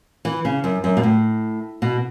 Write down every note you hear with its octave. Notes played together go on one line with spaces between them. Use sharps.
E3
C#3
F#2
F#2
B2
A2
B2